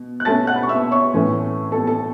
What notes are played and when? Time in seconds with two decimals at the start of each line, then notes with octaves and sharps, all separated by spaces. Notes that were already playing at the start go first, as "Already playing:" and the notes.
Already playing: B2
0.20 F#6
0.25 B2 A3 C#4 A5 A6
0.47 F#5 F#6
0.56 B5
0.63 C#6
0.69 E5 E6
0.91 C#5 C#6
1.14 A2 E3 A3 C#4
1.72 A4 A5
1.87 A4 A5